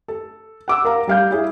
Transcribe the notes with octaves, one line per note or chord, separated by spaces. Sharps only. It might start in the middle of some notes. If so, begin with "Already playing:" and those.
A4
F#5 D6 E6
A#4 F5 A#5
G3 F5 G6
E4 G#4